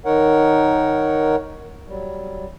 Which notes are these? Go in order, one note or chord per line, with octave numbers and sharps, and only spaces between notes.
D#3 D#4 A#4 C#5 F#5
F#3 G3